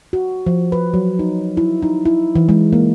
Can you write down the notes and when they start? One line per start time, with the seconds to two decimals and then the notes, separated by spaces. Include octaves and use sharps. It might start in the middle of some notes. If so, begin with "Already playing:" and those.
0.13 F#4
0.46 F3
0.72 B4
0.94 F#3
1.19 D#4
1.57 E4
1.82 D#4
2.05 E4
2.35 E3
2.49 G#3
2.73 A#3